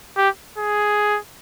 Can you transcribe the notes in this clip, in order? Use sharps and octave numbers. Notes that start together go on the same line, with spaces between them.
G4
G#4